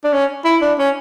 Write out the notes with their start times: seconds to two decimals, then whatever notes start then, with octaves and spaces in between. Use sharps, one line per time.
0.04 D4
0.13 C#4
0.45 E4
0.62 D4
0.78 C#4